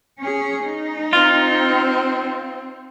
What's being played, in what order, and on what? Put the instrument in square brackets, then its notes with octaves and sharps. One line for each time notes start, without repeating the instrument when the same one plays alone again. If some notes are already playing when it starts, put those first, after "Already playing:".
[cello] C#4 G#4
D#4
[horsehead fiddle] C4 [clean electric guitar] F4